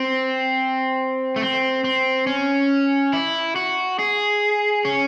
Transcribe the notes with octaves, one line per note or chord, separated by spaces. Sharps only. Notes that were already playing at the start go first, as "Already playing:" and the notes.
Already playing: C4
A3
C4
C4
C#4
E4
F#4
G#4
C#4